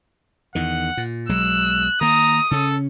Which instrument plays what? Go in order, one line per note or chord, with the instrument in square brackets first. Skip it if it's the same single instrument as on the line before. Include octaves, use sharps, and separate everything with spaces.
[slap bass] E2 D#3 [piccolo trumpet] F#5
[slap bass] A#2
[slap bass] B1 F#3 G#3 [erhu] E6 [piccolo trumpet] F#6
[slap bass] D#3 A#3 [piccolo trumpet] A#5 [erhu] D#6
[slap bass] C#3 C#4 [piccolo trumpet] A4